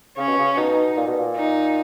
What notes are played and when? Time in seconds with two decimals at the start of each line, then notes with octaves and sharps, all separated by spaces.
0.18 C#3 C#4
0.28 B2
0.38 C#3
0.57 B2 D#4
0.97 A#2
1.08 B2
1.19 A#2
1.36 D#4